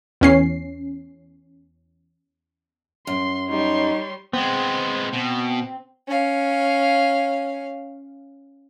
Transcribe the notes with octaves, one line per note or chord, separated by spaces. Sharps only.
E2 C#4 C7
F#2 C6
G3 D#4 C#5 C6
G#3 B3 C4
B2
C#4 F5